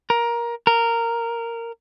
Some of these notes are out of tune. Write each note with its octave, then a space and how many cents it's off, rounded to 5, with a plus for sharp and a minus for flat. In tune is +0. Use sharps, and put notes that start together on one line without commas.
A#4 +15
A#4 -10